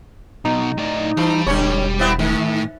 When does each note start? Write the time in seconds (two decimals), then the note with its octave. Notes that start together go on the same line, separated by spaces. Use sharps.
0.45 B1 B2 D#4
0.78 A2 D5
1.17 E3 G3 B5
1.47 E1 D3 C#4 C#5
1.99 B3 C4 E4
2.19 A2 D#3